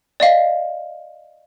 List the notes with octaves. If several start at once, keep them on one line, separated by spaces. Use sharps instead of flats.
D5 D#5 F5